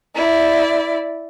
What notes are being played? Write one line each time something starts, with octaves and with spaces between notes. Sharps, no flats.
E4 D5